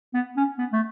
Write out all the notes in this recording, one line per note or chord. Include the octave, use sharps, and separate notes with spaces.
B3
C#4
B3
A3